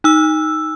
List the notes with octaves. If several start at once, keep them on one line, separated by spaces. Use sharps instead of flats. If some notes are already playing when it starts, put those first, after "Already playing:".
D#4 E6